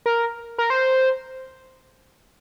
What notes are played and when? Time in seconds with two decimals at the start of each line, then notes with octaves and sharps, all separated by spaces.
0.06 A#4
0.58 A#4
0.70 C5